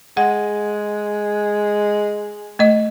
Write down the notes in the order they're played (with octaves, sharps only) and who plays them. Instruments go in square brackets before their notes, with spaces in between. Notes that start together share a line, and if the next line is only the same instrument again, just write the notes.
[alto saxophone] G#3 [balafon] F#5
[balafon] A3 D#5